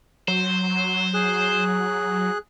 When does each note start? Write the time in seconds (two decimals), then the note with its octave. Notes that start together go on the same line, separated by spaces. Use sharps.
0.28 F#3 C5
1.14 G#4 F#6